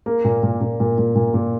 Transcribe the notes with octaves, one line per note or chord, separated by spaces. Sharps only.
A#3
A#2
A#2
A#2
A#2
A#2
A#2
A#2